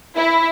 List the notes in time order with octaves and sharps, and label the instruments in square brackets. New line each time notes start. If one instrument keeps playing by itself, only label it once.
[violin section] E4